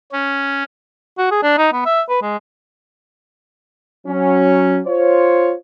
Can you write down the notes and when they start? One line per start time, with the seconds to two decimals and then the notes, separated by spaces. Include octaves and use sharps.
0.12 C#4
1.18 F#4
1.31 G#4
1.43 D4
1.58 D#4
1.73 B3
1.86 E5
2.09 B4
2.22 G#3
4.07 F#3 C#4
4.87 F4 C5 C#5